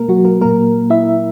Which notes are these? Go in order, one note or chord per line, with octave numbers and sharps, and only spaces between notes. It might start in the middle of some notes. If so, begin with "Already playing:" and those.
Already playing: B2 G#3 A#3 A#4
F#3 F#4
A#3 A#4
A#2 F#3 A#3 A#4
E4 E5